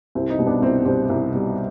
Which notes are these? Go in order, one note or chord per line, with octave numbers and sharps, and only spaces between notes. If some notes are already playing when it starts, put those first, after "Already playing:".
C2 C4
C4 D#4
B2 G3
B3 D4
C2 C4
B2 G3 C4
C2
B2 G3